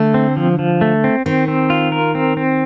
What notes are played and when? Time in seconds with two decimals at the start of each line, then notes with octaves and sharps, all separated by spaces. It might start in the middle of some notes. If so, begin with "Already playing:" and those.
Already playing: D3 A3
0.14 C4
0.37 F3
0.59 F3
0.81 A3
1.04 C4
1.26 D#3 C4
1.48 C4
1.70 F4
1.92 A#4
2.15 C4
2.37 C4